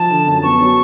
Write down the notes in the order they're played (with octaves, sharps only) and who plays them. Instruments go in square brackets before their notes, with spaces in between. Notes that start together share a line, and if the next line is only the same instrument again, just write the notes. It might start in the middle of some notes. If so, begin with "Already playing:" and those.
Already playing: [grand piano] F3 [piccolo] A5
[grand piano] D3
F#2
[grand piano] B3 [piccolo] C#6
[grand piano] F#3